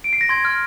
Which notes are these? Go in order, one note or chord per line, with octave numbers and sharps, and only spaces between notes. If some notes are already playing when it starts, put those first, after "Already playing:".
D7
C7
A#6
C6 G#6
F6